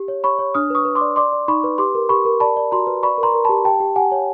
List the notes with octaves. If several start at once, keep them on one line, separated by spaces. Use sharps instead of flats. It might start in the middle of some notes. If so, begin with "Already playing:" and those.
Already playing: G4
C#5
C#5 B5 C#6
C#5
D4 D#6 F6
B4 C#6 D#6
B4
C6 D6
D5
D5 C6 D6
D5
D#4 B5 C#6
B4
G4 C6 D6
A#4
G4 B5 C#6
A#4
D5 A5 B5
D5
F#4 A#5 C6
B4
D5 B5 C#6
A#4
A#5 C6
A#4
A5 B5
G4
G4 G5 A5
G4
G4 F#5 G#5
C#5